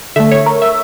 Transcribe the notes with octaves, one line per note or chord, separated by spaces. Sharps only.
D3 A3 E5
C#5
A#4
E5